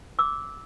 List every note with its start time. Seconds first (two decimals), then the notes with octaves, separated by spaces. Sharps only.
0.19 D6 E6